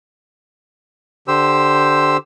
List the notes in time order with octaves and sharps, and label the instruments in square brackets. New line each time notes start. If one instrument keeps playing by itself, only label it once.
[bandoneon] D3 G4 C5 E6